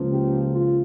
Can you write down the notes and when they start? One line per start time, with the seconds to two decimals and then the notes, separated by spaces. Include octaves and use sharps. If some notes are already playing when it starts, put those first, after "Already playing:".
Already playing: C#2 C#3 F3 A#3
0.08 G4
0.51 F4